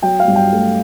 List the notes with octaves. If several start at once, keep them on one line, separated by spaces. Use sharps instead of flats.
F#3 G5
F5
G2
G5
A3